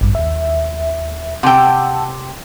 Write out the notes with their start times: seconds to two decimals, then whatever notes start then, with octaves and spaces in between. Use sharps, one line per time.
0.01 A1 G2
0.15 D#2 E5
1.43 C3 F#5 G5 A5 E6